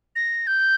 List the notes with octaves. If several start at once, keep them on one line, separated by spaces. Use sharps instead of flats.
A#6
G6